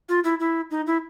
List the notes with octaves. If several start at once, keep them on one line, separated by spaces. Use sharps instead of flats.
F4
E4
E4
D#4
E4